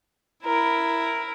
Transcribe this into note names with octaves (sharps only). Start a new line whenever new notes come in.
E4 A#4